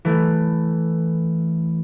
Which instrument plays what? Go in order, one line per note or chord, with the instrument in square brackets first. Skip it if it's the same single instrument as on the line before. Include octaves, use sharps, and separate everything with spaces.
[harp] E3 A3